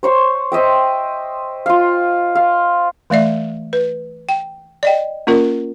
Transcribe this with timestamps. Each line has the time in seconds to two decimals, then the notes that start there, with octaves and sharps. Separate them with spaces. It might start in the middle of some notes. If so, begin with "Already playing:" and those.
0.03 C5 C#5 C#6
0.52 C5 D#5 E5 G5
1.66 F4 F5
2.35 F5
3.10 E3 A3 D5 E5
3.73 B4
4.29 G5
4.83 D5 D#5 G5
5.27 A#3 C#4 F4 A#4